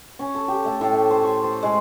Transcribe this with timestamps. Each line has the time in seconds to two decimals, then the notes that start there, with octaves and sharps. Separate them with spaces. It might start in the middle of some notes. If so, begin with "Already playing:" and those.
0.19 C#4
0.35 A4
0.48 G4
0.65 A3
0.81 A2
0.92 E5
1.10 C5
1.23 C#6
1.44 C5
1.63 G#3